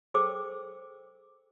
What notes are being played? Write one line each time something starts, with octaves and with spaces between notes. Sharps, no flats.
G#4 A4 C5 G5 D6 E6